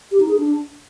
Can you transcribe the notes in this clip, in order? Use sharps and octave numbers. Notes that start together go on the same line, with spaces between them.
G4
D#4
G#4
D4